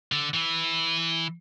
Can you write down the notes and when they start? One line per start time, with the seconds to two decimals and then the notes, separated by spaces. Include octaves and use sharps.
0.12 D3
0.34 E3